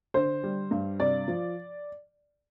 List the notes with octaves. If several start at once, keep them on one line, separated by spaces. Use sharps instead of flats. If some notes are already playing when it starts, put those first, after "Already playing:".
D3 C5
G3
G2
C3 D5
F3